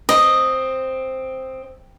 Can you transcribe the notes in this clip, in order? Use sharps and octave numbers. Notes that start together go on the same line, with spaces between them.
C4 D#5